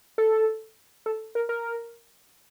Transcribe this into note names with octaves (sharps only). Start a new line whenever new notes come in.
A4
A4
A#4
A#4